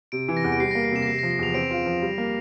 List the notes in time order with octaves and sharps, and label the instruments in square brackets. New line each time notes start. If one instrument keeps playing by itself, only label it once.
[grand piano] C3 [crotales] D7
[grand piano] E3
[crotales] A#6
[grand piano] E2
[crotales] D7
[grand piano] G3 [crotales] C7
[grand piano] A#3 [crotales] A#6
[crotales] C7
[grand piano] C3 [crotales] E7
[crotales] A#6
[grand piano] C3 [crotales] C7
[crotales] A#6
[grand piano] F3
[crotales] A#6
[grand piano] E2 [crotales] F7
[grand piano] C4 [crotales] D7
[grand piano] F4
F3
G3
A#3